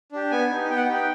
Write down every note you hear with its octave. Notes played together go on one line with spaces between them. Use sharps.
D4 G4
B3 G#5
D#4 G4
B3 G5
F#5
D#4 G4 G5